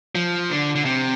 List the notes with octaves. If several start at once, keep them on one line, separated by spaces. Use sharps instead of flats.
F3
D3
D3
C3